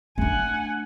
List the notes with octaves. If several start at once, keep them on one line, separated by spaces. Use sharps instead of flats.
A3 D4 F#5 G#5